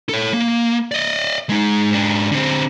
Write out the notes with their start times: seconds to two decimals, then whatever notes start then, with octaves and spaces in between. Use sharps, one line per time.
0.09 A4 C#5
0.34 A#3
0.92 D5 D#5
1.49 G#3 D#4
1.91 G#2 D4
2.32 D3 C4